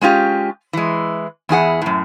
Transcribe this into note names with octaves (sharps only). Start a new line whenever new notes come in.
G#3 C#4 F4 G4
E3 G#3
E2 E4 G#4 F#5
F#2 A2